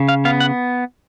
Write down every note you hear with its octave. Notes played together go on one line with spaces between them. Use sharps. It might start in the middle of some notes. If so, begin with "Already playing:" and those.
Already playing: C#3
F5
B3 F5
F#5